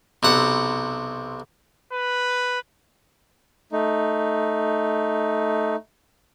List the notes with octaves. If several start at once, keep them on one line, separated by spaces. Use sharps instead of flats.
B1 C3 F#5
B4
A3 D#4